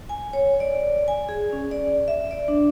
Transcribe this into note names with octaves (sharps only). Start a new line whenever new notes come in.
G#5
C#5
D5
G#5
G#4
C#4
D5
E5
D5
D4